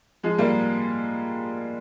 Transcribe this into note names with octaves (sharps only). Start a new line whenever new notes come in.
F3 G#3
G3 A#3